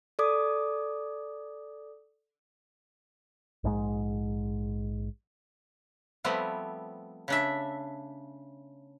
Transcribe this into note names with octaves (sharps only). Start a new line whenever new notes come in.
A4 D5 D6 D#6
A#1 G#2 C3 G#3
F3 G3 A3 B3 C4
C#3 D4 E5